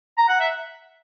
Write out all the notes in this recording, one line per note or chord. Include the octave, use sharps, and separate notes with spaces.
A#5
F#5
E5